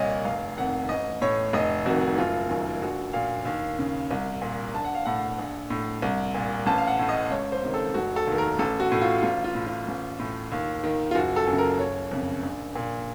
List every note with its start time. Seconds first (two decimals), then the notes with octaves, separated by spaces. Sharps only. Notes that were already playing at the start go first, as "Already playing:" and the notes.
Already playing: C2 A#2 C#5 D#5
0.25 F1 F5
0.57 F2 D#3 F#5
0.89 A1 D#5
1.21 A2 C#5
1.53 F1 D#5
1.85 F2 D#3 F#4
2.17 F#1 F4
2.50 F#2 D#3
2.82 A#1 F#4
3.13 A#2 F5
3.45 D#2
3.79 C#3
4.11 C2
4.42 A#2
4.74 A#1 A5
4.85 F#5
4.95 F5
5.06 A2 F#5
5.39 A#1
5.70 A2
6.02 C2
6.35 A#2
6.66 A1 A5
6.78 F5
6.88 F#5
6.99 A2
7.09 D#5
7.30 C#2 C#5
7.52 C5
7.63 C3 D#3
7.74 A4
7.94 F1 F#4
8.16 A4
8.27 D#2 D#3
8.38 A#4
8.59 A1 A4
8.80 F#4
8.92 A2
9.02 F4
9.23 A1 F4
9.44 F4
9.55 A2
9.66 F4
9.88 A1
10.19 A2
10.52 D#2
10.83 D#3
11.11 F4
11.15 F#1 F#4
11.36 A4
11.47 F#2
11.53 C#3
11.58 A#4
11.79 F#1 C#5
12.11 F2 C#3
12.43 A#1
12.75 A#2